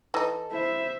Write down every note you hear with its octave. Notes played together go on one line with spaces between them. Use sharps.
E3 D#4 A4
E4 C5 E5